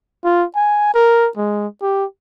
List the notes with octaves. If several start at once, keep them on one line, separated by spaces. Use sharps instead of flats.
F4
G#5
A#4
G#3
G4